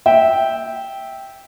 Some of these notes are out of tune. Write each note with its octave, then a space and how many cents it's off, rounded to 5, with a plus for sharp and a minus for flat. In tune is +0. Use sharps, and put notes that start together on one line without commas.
E5 -10 G5 +0